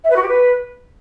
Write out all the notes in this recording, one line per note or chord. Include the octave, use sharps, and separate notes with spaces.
E5
B4
F#4
G4
B4